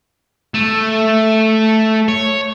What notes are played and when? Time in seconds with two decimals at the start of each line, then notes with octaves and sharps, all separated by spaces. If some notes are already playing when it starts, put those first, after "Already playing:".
0.54 A3
2.09 C#5